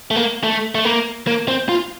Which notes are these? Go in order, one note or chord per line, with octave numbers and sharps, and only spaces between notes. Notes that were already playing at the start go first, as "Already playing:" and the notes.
A3
A#3
A3
A3
A#3
A#3
C4
F4